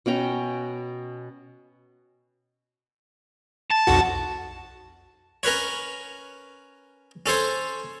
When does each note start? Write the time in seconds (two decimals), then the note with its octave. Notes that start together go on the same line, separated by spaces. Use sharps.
0.06 B2 C#4 G5 A#5
3.70 A5
3.87 B1 F2 F#4
5.43 C#4 A#4 B4 C#5
7.26 C#4 A4 C5 C#5